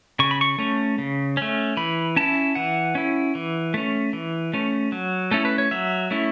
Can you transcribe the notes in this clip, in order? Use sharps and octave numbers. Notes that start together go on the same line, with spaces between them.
C#3 C#6
B5
C#6
A3 C#4
C#3
A3 C#4
E3 B5
C#4 E4 A5
E3 F#5
C#4 E4
E3
A3 C#4
E3
A3 C#4
F#3
A3 C#4 E4 A4
B4
C#5
F#3 E5
A3 C#4 E4